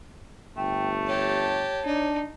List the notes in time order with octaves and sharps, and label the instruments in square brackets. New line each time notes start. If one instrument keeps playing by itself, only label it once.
[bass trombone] G1 [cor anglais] A3 [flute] G5
[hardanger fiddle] G4 A5 [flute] C#5
[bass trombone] D4 [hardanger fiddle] D#4